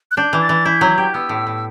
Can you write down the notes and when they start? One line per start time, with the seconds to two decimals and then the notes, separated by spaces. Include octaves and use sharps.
0.11 F#6
0.17 D4 G6
0.33 E3
0.42 A6
0.49 E3
0.66 E4 G6
0.81 F#3
0.98 G4
1.14 B3 E6
1.29 A2
1.47 A2